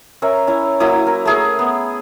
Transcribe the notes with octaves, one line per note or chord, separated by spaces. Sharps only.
C#4 A#4 C#5 E5
C#4 E4
F#3 A#3 E4 D#6
A#4
A3 G#4 A#4
B3